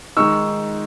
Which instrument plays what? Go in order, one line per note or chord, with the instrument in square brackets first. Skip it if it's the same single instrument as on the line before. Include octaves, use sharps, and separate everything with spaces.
[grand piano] D#3 G#3 D#4 C#6 E6